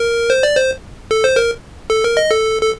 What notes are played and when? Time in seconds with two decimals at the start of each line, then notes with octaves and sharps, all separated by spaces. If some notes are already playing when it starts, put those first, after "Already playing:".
Already playing: A#4
0.30 C5
0.43 D5
0.57 C5
1.11 A4
1.24 C5
1.36 A#4
1.90 A4
2.04 A#4
2.17 D#5
2.31 A4
2.62 A4